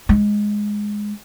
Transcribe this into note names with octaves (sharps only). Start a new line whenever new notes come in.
G#3